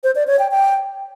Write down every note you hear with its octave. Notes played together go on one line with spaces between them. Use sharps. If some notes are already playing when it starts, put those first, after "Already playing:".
C5
D5
C#5
G5
G5